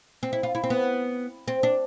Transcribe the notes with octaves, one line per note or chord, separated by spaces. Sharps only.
C4
E4
F4
E4
C4
B3
C4
D4